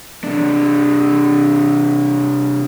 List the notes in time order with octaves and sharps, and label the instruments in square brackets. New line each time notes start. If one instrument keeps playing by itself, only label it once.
[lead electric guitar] C3 D4